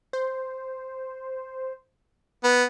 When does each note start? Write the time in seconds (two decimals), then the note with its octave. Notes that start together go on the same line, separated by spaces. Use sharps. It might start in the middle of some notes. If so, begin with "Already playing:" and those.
0.13 C5
2.44 B3